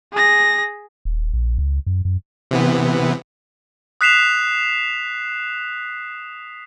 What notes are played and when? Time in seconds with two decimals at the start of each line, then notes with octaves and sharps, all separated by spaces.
0.13 G#4 A#6
1.05 D#1
1.33 A#1
1.58 C#2
1.87 F#2
2.05 F#2
2.51 C3 E3 B3
4.01 D#6 F#6 B6 C7 E7 F7